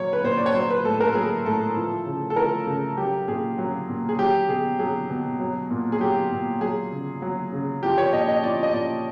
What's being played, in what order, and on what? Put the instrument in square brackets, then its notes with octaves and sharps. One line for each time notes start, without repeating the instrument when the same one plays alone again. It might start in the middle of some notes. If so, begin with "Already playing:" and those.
Already playing: [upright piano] A#2 F#3 C#5
B4
A#2 C5
D5
C#5
F#3 C5
B4
A2 A4
A#4
F#3 G#4
A2 A4
F3
C#3
A4
F3 A#4
C#3
F#3 G4
A#2 G#4
F#3
A#2
G#4
F#3 G4
B2 G#4
F#3 G#4
B2
F#3
A#2
G#4
F#3 G4
A#2
F#3 G#4
C#3
F#3
C#3
F3 G4
C#5
A#2 D#5
D#5
F3 D5
D#5
A#2 D5